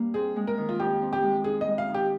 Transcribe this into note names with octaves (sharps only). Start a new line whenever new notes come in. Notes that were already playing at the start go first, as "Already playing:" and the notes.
Already playing: G2 G3 A#3
C4 G#4
G#3
A#4
D#3
F4
F2 G4
C4
G4
G#3
D#4 G#4
D#5
G#3
F5
D#3
G4